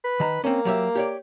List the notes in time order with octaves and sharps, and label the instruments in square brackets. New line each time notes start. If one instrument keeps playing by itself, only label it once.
[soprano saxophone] B4
[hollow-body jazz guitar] D#3 A#5
[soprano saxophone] A#3 [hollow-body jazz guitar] C4 C#4
[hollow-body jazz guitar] F#3 G4 E5
G4 C#5 D5